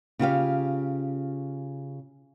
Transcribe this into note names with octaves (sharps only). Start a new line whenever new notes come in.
C#3 F4 G4 F5